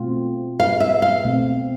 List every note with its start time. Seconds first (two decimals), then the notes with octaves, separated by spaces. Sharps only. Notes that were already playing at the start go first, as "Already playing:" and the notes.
Already playing: B2 A3 C4 F4
0.60 F5
0.80 E5
1.02 F5
1.25 B2 A3 C4